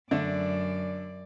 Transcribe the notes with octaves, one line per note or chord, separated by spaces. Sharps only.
F#2 D3 A3 D4 D5